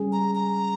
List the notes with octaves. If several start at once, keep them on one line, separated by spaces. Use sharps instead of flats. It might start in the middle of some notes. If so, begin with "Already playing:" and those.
Already playing: G3 C#4 G#4
A#5
A#5